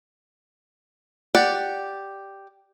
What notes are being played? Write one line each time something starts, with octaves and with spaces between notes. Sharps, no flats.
G4 D5 F#5